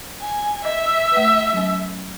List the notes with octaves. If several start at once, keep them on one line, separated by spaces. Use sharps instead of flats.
G#5
D#5 E5
A3 B4
F#3 C#4